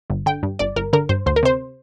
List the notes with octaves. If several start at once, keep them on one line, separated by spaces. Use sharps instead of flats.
G1
D3 G5
G2
G1 D5
G1 A#4
D3 A#4
G2 C5
D2 C5
A#4
C3 C5